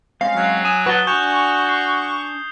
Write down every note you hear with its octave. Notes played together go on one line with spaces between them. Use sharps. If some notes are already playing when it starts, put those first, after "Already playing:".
G#3 C4 C#4 F5
F#3 F5
G#5 D#6 E7
F#4 B4 A5 E7 G7
D4 F#4 G#5 C#6 G6 E7 F7
G#6 C7